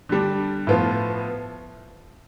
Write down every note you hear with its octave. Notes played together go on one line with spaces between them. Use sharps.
D3 G3 D4
A2 F3 B3 F4